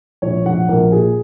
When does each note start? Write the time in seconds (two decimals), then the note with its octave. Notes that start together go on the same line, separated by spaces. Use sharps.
0.22 A#1 C#5
0.45 A#1 F#5
0.68 A#1 A#4
0.92 A#2 G#4